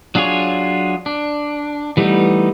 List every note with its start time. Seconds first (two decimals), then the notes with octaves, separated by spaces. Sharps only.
0.15 F#3 D4 F4 G#4 C#5
1.06 D4
1.97 E3 G3 A3 B3 D#4